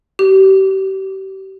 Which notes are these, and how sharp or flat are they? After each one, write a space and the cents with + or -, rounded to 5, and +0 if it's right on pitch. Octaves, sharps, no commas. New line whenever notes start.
G4 -35